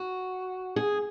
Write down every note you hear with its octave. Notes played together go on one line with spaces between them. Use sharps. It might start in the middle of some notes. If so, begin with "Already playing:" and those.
Already playing: F#4
G#4